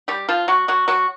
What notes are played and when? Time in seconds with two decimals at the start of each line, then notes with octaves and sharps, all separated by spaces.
0.08 G3 G4
0.28 F3 F4
0.48 F#3 F#4
0.68 F#3 F#4
0.88 F#3 F#4